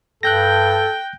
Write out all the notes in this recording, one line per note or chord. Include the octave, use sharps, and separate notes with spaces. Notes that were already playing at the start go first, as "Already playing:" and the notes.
G2 A4 G5 F#6 G6 A#6